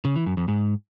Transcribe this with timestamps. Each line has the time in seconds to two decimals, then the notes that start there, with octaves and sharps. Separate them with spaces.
0.05 C#3
0.16 E3
0.26 F#2
0.37 F2
0.48 G#2